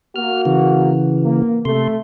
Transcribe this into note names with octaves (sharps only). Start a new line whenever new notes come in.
A#3 F#4 F6
C#3 E3
A#3
C3 A3 C6